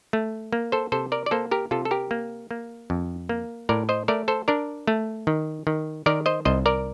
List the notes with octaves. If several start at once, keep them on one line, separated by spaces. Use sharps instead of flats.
A3
A#3
A4 C5
C3 A4 C5
A#4 D5
D5
A#3 A4 C5
G4 A#4
C3 F4 A4
A4
G4 A#4
A#3
A#3
F2
A#3
A2 A#4 D5
C5 D#5
A3 A#4 D5
A4 C5
D4 A#4 D5
A3
D#3
D#3
D#3 A#4 D5
C5 D#5
C2 C5 D#5
A#4 D5